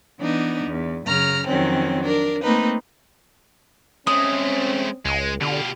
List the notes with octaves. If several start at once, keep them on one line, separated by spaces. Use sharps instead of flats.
E3 B3 D4 D#4
E2
F#2 C#3 A#5 F6
F2 D#3 F#3 C4 C#4
D4 A#4
A3 A#3 C4 D#4 B4
G#3 A3 C4 C#4 D#6
C#2 G#3
B2 D3 F4 G4